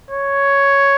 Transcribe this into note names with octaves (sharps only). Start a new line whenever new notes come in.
C#5